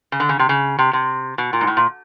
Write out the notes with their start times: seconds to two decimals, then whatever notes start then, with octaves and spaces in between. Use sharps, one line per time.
0.12 C#3
0.20 D3
0.29 C#3
0.39 C3
0.49 C#3
0.79 C3
0.93 C3
1.38 B2
1.53 A#2
1.61 G#2
1.67 A2
1.77 A#2